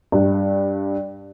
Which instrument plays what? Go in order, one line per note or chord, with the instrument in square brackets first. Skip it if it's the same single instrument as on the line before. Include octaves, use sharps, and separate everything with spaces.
[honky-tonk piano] G2